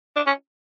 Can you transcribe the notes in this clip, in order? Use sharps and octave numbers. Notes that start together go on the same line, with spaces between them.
D4
C#4